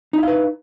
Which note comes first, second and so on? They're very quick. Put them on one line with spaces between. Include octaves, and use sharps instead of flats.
D#4 E4 F5 B4